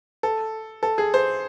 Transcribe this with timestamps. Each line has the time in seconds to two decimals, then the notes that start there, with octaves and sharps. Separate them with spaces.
0.23 A4
0.83 A4
0.98 G#4
1.14 C5